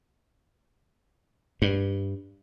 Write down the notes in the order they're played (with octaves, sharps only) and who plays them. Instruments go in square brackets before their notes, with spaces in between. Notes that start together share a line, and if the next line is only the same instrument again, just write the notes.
[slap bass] G2